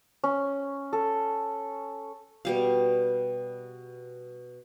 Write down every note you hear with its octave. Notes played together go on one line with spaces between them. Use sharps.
C#4
A4
B2 G3 F5